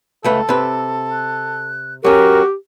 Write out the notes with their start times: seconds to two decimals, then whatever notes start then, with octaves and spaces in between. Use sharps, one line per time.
0.24 C#2 A3 A4 B4
0.49 C3 B4
1.13 F#6
2.05 F#3 C#4 F#4 G4 A#4 G5